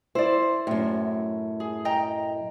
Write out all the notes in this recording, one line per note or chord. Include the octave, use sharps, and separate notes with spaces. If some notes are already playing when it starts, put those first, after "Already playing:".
E4 C5 D5
F#2 A2
G#4
D#5 G5 A#5